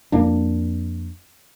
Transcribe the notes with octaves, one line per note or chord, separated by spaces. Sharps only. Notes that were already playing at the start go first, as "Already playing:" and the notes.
F2 A#3 D4